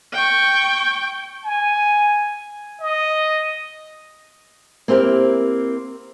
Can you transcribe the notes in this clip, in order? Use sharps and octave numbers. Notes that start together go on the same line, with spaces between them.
G5 C#6
G#5
D#5
A#3 C4 E4 G4 A#4